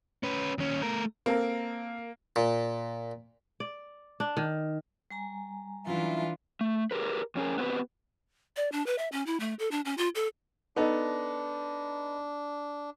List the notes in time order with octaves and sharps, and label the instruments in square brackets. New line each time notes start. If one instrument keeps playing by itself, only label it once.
[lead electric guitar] C#4 B4
D#2 C#4
A3 A#4
[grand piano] A#3 [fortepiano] C4 A4 A#4
[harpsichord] A#2
[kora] D5
D4
D#3
[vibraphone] G3 G#5 A#5
[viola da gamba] E3 D4 [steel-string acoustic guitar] F#3 C#4 E4 [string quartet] F4
[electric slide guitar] A3
G4 G#4 A#4 B4
F2 C#4 G#4 A#4
B3 C4 G4 B4
[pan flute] D5
D4
B4
E5
C#4
E4
A3
A4
D4
C#4
F4
A4
[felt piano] B3 D#4 A4 [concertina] D4